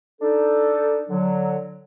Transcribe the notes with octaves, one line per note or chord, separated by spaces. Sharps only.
D4 D#4 A4
D3 F#3